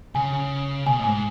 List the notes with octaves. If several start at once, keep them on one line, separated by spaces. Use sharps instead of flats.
C#3 G#5
C#3
B2 G#5
A2
G#2 G#5